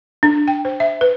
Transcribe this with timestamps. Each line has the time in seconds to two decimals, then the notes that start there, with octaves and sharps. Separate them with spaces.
0.23 D4
0.48 G5
0.65 C5
0.80 E5
1.01 B4